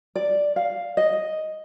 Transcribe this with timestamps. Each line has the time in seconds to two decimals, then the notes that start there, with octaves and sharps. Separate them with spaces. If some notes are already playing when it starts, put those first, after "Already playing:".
0.15 D5
0.56 F5
0.97 D#5